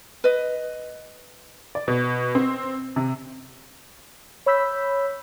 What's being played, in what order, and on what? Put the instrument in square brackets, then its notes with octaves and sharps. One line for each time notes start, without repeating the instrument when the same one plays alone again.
[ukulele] B4 D#5
[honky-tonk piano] D5
B2
C4
C3
[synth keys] C#5 B5 E6 G6 B6